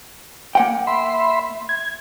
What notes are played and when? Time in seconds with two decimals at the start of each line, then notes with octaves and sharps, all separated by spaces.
0.55 A#3 F#5 G5
0.87 E5 B5 C6
1.69 G#6